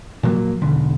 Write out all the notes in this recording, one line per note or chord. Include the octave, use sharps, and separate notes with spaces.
A#2 F3 F#3 A#3
E1 B1 D3